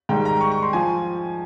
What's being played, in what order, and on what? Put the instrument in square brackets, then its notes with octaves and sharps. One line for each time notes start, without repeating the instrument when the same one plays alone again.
[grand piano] G#2 D#3 G3 G5
A#5
C#6
C#6
C6
F3 G#5